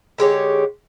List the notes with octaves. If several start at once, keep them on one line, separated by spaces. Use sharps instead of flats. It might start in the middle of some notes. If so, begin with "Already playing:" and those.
D3 G#3 G4 C#5